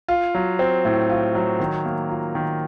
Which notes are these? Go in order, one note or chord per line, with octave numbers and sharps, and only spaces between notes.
F4
F#3
C4
A2
F4
F#3
D#3
A#3
F4
D#3